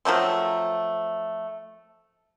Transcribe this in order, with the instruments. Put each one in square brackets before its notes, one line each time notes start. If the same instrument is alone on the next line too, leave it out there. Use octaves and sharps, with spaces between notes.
[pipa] F3 F#3 A3 C4